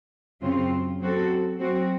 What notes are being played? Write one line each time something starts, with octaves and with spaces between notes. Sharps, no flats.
F#2 C#3 F#3 C4 F4
F#3 C4 F#4 A4
F#3 C4 F#4